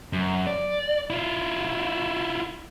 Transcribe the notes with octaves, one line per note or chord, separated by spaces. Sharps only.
F#2
D5
E4 F4